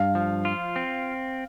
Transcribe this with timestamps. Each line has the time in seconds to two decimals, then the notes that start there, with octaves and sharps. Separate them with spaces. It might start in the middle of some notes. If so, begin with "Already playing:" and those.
Already playing: G2 F5
0.15 F3
0.45 F4
0.76 C4